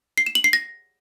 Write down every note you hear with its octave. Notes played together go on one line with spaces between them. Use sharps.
C7
E7
F#7
C7
A#6